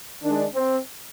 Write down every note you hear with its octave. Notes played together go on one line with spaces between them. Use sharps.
D#3 G#3 D4
C4